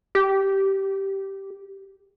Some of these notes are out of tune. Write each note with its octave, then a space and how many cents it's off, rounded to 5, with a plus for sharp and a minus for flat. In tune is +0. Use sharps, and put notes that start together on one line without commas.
G4 -10